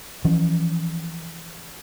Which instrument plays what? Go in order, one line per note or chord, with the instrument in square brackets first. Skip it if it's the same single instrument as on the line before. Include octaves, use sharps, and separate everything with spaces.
[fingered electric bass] E3 F3 C#4